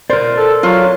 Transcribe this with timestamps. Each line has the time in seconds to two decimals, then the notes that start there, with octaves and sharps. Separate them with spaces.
0.10 A#4 C5 D5
0.37 A4
0.63 F#3 F4